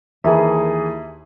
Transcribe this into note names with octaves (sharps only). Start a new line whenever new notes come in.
D#2 E3 G#4 A#4 E5